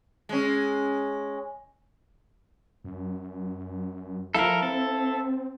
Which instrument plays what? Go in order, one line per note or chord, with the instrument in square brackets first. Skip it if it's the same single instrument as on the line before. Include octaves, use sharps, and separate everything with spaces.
[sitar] G#3 C#4
[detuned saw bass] F#2
[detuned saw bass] F3 [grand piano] E4 F5 [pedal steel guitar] A4 A#4
[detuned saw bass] C4 [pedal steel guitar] A4